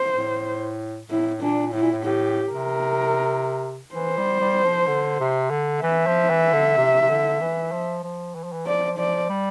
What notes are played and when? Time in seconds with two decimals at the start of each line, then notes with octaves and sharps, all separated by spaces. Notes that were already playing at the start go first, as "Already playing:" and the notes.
Already playing: C5
0.16 A2
1.10 A2 E4
1.42 A#2 D4
1.72 A2 E4
1.82 A#2
1.92 A2
2.04 A2 G4
2.52 C3 A#4
3.94 E3 C5
4.18 G3
4.41 G3
4.64 F3
4.88 D3
5.20 C3
5.51 D3
5.83 E3 E5
6.07 F3
6.30 E3
6.53 D3
6.78 C3
7.02 C3
7.09 D3
7.41 E3
7.72 F3
8.03 F3
8.35 E3
8.44 F3
8.53 E3
8.66 F3 D5
8.97 F3 D5
9.30 G3